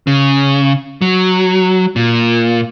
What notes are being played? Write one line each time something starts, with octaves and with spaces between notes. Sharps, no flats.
C#3
F#3
A#2